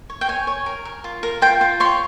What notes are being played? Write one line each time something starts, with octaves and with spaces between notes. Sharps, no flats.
C#5
G5
C#5 G#5
C#5
A#4
A#4
F4
A#4
F4 G5
F4
C#5 C6